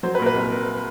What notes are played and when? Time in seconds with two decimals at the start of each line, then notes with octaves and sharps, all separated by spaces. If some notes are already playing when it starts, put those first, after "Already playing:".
0.03 F#3 C5
0.15 B4
0.19 A#2 A#4
0.26 B4
0.34 C2